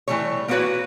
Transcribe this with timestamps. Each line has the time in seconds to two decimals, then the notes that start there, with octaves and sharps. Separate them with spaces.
0.08 E3 F3 G3 A3 C#5
0.48 A#3 B3 E4 F#4 B4 C#5